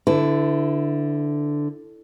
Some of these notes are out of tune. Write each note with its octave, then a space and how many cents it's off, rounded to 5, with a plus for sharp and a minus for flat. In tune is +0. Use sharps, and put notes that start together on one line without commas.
D3 +0 E4 +0 B4 +35